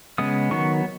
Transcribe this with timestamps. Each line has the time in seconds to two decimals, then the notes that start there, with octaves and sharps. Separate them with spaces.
0.18 C#3 G#3 B3 D#6
0.51 D#3 F#3 B3 C#6